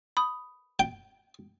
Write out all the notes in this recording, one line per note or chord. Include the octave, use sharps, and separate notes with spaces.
B5 D#6
G5